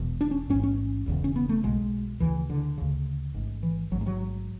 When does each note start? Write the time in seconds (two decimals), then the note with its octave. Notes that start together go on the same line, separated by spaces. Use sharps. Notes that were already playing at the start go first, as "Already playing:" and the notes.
Already playing: E1 E2 B2
0.21 D4
0.31 C#4
0.49 A1 G#2 C#4
0.63 C#4
1.06 E1 E2 C#3
1.24 C#4
1.36 B3
1.49 A3
1.63 B1 B2 G#3
2.20 D2 C#3 E3
2.50 D3
2.78 D2 C#3
3.34 A1 G#2
3.63 E3
3.91 A1 G#2 F#3
4.01 G#3
4.06 F#3